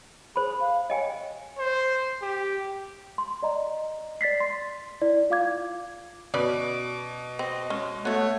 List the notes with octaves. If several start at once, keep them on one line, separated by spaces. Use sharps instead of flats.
G#4 C5 B5
F5
C#5 D#5 G5 G#5
C5
G4
C6
D5 D#5 A#5
D5 A6 B6 C7
C6
E4 D5
F4 F5 D6 G#6
B2 C#4 B4 D5 D6
C4 D#5
G#3 C#4
A3 B3 F#4 C#5